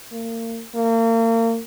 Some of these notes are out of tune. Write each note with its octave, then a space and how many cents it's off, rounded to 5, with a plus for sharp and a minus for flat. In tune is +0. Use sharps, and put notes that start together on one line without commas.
A#3 -35
A#3 -35